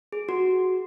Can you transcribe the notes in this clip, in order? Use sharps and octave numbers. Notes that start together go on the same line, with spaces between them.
G#4
F#4